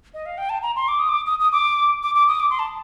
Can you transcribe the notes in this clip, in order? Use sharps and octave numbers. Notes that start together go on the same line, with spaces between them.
D#5
F5
G5
A5
A#5
C6
D6
D#6
D6
D#6
D#6
D6
D6
D6
D#6
D6
C6
A5